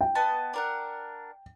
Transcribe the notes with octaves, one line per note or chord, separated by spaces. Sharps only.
G5
B3 D#5 A5
D4 A#4 F#5